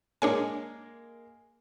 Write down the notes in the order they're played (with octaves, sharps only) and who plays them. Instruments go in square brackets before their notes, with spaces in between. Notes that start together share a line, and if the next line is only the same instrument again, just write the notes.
[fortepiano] G#3 A#3 [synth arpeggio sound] D4 C#5 G#5